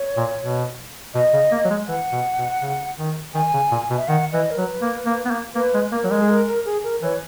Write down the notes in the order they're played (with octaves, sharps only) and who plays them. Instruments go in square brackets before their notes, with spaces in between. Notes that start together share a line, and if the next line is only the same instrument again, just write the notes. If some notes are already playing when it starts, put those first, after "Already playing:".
Already playing: [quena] C#5
[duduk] A#2
B2
[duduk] B2 [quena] D#5
[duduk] C#3
A#3
F#3
G#3
[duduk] E3 [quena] F#5
[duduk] B2
B2
C#3
D#3
[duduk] D#3 [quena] G#5
[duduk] C#3
A#2
B2
[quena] E5
[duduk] D#3 [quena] F#5
[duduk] E3 [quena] D#5
[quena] A#4
[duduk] F#3 [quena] B4
[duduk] A#3
A#3
B3
A#3
[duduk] A#3 [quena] B4
[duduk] G#3
[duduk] A#3 [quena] A#4
[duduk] F#3
G#3
[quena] G#4
A#4
A#4
G#4
A#4
[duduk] E3 [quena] C#5